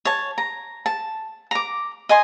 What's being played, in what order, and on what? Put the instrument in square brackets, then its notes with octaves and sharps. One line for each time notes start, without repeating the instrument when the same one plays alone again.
[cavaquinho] C#5 A5
A#5
A5
A#5 D6
D#5 G#5 C6